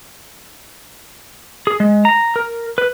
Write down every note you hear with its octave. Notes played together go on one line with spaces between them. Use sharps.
G#4
G#3
A#5
A#4
B4